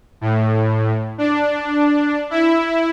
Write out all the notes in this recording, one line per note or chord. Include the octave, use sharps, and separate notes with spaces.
A2
D4
E4